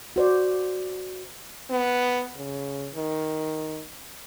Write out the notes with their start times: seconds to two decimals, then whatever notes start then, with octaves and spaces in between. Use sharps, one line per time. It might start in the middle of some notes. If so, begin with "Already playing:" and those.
0.16 F#4 C5 D5
1.70 B3
2.36 C#3
2.95 D#3